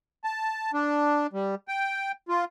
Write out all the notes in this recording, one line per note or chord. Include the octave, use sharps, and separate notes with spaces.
A5
D4
G3
G5
F4